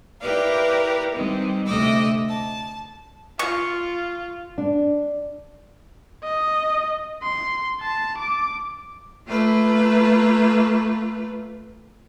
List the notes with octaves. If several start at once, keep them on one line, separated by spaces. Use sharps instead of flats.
E4 G4 A#4 B4 D5 F5
D#3 G3 G#3 C4
D2 C3 A3 D#5 D6 E6
A5
F4 C#6
D4
D#5
C6
A5
D6
A3 A#3 F4 B4